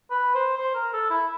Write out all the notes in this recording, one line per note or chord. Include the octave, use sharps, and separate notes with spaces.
B4
C5
C5
A#4
A4
E4